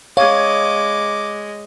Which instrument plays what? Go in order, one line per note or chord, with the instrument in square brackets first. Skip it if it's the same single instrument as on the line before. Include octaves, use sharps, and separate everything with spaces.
[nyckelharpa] G#3 D#5 [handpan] C#5 [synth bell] F5 [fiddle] D6